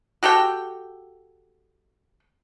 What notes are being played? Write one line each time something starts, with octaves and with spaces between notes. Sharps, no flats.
F#4 G4 A4 G5